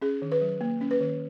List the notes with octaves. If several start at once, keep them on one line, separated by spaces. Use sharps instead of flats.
C#4 G#4
D#3
B4
F#3
A#3
C#4
B4
D#3